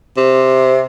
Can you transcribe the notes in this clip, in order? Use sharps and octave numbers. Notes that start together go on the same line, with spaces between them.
C3